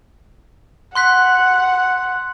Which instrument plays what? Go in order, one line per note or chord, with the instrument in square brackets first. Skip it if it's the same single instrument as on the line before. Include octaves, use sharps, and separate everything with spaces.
[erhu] F#5 [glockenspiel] C6 F#6 B6